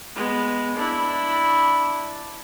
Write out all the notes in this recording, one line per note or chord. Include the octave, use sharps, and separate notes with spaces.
G#3 B3
D4 E4